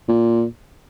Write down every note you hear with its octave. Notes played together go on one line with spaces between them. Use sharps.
A#2